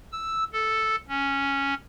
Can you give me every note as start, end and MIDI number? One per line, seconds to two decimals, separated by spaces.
0.12 0.44 88
0.53 0.96 69
1.08 1.74 61